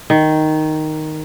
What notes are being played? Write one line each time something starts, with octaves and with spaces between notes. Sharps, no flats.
D#3